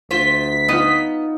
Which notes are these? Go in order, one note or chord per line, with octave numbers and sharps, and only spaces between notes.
D2 F4 C5 B6
B3 D#4 F4 D#5